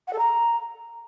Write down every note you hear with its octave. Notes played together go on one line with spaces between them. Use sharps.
F#5
A4
A#5